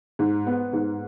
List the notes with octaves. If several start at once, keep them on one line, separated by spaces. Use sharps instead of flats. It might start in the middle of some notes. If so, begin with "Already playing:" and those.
G#2
B3
G#2